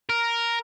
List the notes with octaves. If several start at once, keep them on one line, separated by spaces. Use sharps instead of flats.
A#4